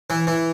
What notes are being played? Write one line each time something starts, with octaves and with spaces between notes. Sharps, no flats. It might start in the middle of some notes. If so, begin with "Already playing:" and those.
E3
E3